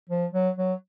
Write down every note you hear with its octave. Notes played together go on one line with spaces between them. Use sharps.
F3
F#3
F#3